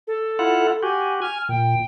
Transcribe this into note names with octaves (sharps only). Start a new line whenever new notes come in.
A4
E4 F4 F#5
F#4 G4 G#5
G#5 F6
A#2 G5